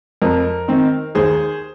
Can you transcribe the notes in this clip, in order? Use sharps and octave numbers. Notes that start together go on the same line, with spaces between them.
F2 A#4
D#3 C4 D#4
D#2 G#4 C5